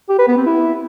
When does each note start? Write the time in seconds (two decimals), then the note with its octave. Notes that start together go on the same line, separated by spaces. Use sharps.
0.09 G4
0.18 B4
0.28 B3
0.37 C4
0.46 E4